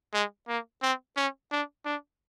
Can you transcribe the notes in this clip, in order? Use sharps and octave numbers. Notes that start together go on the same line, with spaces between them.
G#3
A#3
C4
C#4
D4
D4